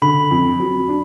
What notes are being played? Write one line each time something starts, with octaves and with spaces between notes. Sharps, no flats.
D3 B5
F2
F#3
D4